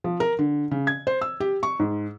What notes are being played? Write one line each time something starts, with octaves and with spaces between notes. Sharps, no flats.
F3
A#4
D3
C#3
G#6
C5
E6
G4
C#6
G#2